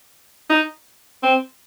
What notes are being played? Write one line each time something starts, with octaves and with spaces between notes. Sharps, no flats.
D#4
C4